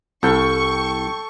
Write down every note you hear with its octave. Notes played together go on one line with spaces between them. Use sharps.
C2 A4 G5 C#6